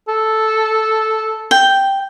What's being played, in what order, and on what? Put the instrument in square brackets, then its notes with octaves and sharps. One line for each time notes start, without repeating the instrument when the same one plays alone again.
[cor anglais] A4
[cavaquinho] G5